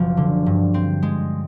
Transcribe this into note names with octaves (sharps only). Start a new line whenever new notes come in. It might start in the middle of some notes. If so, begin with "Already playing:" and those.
Already playing: F#1 B1 F3
D3
G2
C4
G#3